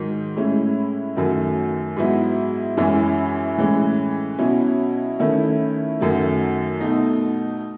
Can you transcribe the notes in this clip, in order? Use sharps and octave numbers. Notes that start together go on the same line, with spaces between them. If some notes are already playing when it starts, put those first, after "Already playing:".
Already playing: G#2 D#3 F#3
A2 G#3 C#4 E4
F#2 D#3 F#3 A3
G#2 F#3 B3 E4
F#2 E3 G#3 C#4 E4
A2 E3 G#3 C#4
B2 F#3 C#4 E4
D#3 A3 C#4 E4
F#2 D#3 F#3 A3
B2 A3 D#4